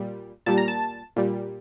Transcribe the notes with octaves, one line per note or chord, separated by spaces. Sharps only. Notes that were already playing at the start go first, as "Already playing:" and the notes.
Already playing: A#2 G3
A#2 G3 A5
A#5
A5
A#2 G3